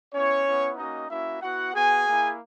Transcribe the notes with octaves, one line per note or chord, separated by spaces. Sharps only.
B3 C#4 E4 C#5
B3 E4
A#3 C#4 D#4 F#4 D#5
A#3 C#4 E4 F#4 E5
B3 E4 F#4 F#5
B3 F#4 G#4 G#5
A#3 E4